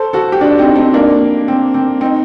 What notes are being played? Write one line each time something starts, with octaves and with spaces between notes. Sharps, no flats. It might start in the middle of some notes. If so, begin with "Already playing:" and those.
Already playing: A4 C5
F#4 A4
G4
D4 F#4
C4 D#4
C4 D#4
A#3 D4
C4
C4
C4 D#4